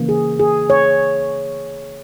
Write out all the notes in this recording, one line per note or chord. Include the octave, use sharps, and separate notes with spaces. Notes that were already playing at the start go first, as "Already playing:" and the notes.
Already playing: C#3 E3 A#3
G#4
G#4
C#5